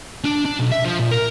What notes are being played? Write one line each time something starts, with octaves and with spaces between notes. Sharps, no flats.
D4
D4
B1
E5
F3
A#2
A#4